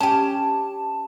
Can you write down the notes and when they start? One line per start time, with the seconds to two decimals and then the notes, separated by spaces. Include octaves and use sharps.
0.01 C#4 G4 A5